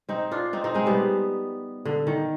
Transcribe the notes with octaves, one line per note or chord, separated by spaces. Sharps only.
C4 D#4
D4 F4
C4 D#4
C4 D#4
G#3 C4
G3 B3
D3
D#3